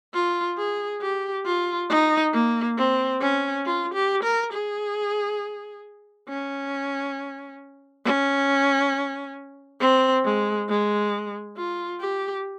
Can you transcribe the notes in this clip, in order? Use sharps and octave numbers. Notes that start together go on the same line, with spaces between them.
F4
G#4
G4
F4
D#4
A#3
C4
C#4
F4
G4
A#4
G#4
C#4
C#4
C4
G#3
G#3
F4
G4